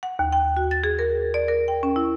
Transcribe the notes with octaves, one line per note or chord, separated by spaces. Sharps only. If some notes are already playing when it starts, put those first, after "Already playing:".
F#5
D#2
G5
F#4
A6
G#4
A#4
D5
A#4
G5
C#4
E4